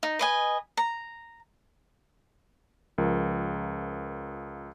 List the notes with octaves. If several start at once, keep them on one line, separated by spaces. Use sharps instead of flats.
D#4
B4 D#5 G#5
A#5
C#2 F3 A#4